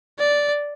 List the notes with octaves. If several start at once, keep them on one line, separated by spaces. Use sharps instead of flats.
D5